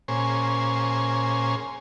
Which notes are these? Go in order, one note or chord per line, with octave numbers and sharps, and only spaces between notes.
A#2 C#4 G#4 C5